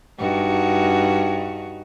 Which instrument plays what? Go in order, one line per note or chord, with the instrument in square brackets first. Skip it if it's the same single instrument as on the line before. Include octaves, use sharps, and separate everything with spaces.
[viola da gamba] G2 D#4 F#4